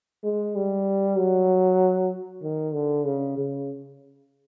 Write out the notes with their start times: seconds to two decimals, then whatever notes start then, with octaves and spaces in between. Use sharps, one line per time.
0.24 G#3
0.56 G3
1.18 F#3
2.43 D#3
2.74 D3
3.06 C#3
3.37 C#3